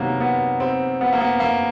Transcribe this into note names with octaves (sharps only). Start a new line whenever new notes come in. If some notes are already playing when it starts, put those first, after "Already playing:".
Already playing: C3 D#3 F#3 A#3 B3
B3
C4
B3
A#3
B3
A#3